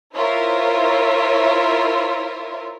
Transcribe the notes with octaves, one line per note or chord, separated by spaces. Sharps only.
E4 F4 A#4 C5 C#5 E5